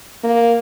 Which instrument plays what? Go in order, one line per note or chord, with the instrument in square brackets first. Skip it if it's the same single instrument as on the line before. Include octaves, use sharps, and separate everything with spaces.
[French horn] A#3